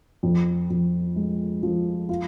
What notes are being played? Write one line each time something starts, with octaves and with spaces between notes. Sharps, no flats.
F2
F2
G#3
F3
F4